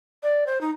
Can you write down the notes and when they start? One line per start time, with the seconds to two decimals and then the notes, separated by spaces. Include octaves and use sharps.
0.23 D5
0.47 C5
0.61 D#4